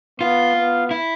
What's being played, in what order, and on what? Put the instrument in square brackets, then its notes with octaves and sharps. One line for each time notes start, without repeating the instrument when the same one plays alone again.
[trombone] B3 [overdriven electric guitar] F4
[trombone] B3
[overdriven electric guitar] E4